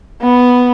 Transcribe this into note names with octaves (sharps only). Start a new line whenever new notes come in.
B3